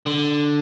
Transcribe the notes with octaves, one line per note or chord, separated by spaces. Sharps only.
D3